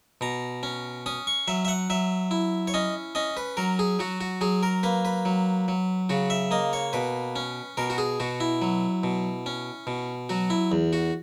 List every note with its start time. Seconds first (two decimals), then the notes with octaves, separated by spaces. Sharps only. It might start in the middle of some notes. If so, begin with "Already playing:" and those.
0.21 B2 A#5
0.63 C#4
1.06 C#4 D#6
1.27 C#6
1.48 F#3 E5
1.65 E5
1.68 F#5
1.90 F#3 E5
2.31 E4
2.68 C#5
2.74 C#4 D#5
3.15 C#4 D#5
3.37 B4
3.57 F#3 A#4
3.79 G#4
3.99 F#3 F#4
4.21 F#4
4.41 F#3 G#4
4.63 A#4
4.83 A#3 B4
5.05 B4
5.25 F#3
5.68 F#3
6.09 C#3 F#4
6.30 E5
6.51 A#3 D#5
6.73 C#5
6.93 B2 B4
7.36 C#4
7.77 B2 A#4
7.90 F#4
7.98 G#4
8.20 B2 F#4
8.40 E4
8.62 F#3
9.03 B2
9.46 C#4
9.87 B2
10.29 F#3 F#4
10.50 E4
10.72 E2
10.93 F#4